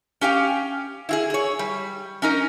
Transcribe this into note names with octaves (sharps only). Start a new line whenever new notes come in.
C#4 G4 F5 G5
E4 F4 G#4
G#4 C#5
G3
C#4 D#4 A#4